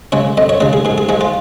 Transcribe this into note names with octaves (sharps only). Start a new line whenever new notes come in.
C#3 G#3 C#5
F2 D#5
C#5
C#3 G#3 G#4
G#4
G#2 G#4
G#4
F3 G#3 G#4
F4